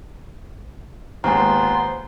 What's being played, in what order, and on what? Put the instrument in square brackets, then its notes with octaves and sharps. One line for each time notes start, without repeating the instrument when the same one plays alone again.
[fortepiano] D#2 G#2 [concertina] B3 F4 C6 [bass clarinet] C5 [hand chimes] G#5 A#5